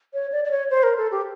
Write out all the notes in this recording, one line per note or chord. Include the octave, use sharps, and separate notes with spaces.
C#5
D5
D5
C#5
C5
A#4
A4
G4